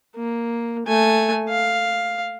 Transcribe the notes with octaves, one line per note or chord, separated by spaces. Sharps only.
A#3
A3 G#5
F5